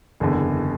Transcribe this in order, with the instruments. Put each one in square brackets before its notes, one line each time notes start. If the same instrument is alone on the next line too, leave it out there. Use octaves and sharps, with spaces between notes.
[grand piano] F#1 E2 D3